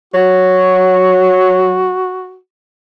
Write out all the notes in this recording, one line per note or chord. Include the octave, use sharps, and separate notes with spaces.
F#3 F#4